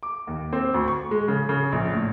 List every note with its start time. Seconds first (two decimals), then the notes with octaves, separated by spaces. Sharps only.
0.03 D6
0.27 D#2
0.53 C4
0.74 D2
0.88 C#6
1.11 G#3
1.28 C#3
1.49 C#3
1.72 A#1
1.93 A2